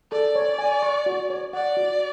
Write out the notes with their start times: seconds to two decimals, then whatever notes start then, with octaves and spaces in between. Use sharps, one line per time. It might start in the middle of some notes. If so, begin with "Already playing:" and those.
0.12 A4 D5
0.35 C#5
0.59 G#5
0.83 C#6
1.06 F#4
1.30 C#5
1.53 D5 F#5
1.77 F#4